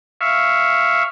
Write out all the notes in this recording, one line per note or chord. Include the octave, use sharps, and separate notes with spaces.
E5 F5 C#6